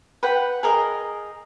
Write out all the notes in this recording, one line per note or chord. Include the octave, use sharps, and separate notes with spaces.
B4 F#5 G5
G#4 A#4 D#5